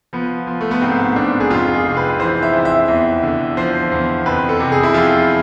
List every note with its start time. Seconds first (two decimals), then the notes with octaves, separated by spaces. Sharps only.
0.13 F3 B3
0.47 F3
0.61 A3
0.71 B3
0.82 G#2 C4
1.16 G#2 D4
1.40 G#4
1.50 F2 F4
1.74 G#4
1.85 C3
1.97 B4
2.19 E3 C5
2.43 E5
2.53 F2
2.65 E5
2.88 E2
3.23 D3
3.57 F3 C5
3.92 E2
4.26 F2 B4
4.49 A4
4.60 C3
4.72 G#4
4.83 E4
4.94 F3 F4